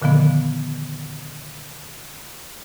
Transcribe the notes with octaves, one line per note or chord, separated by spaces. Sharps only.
A#2 D3 D#3 F3 B3